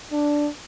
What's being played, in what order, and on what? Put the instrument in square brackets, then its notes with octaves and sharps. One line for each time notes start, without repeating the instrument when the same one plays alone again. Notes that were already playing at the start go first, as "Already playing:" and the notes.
[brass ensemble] D4